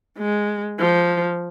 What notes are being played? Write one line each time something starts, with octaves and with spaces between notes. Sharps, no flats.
G#3
F3